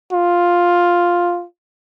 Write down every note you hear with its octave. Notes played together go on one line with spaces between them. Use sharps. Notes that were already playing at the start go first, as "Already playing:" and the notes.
F4